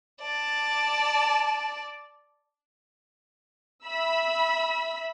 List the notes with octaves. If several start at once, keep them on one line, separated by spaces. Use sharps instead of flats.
D5 A5
E5 B5 E6